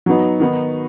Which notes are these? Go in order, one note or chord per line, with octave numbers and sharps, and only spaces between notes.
F#3 B3 D#4
D#3 B3 D#4